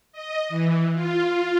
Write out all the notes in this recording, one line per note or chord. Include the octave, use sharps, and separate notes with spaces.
D#5
E3
F4